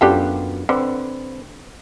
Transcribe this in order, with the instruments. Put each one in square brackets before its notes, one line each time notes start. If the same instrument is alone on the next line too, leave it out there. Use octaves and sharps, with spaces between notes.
[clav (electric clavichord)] F#2 B3 F4 [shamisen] D4 G4 A4
[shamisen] D3 [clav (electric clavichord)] C4 B4